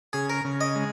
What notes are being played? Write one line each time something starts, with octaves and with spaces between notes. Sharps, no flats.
C#3 G#4
A#4
C#3
D#5
G#3